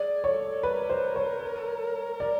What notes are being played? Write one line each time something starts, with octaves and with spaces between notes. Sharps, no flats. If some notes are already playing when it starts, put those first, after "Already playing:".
Already playing: G#4 D5
A4 C#5
A#4 B4
C5
C#5
D5